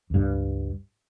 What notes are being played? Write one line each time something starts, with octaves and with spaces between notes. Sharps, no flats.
C#2 G2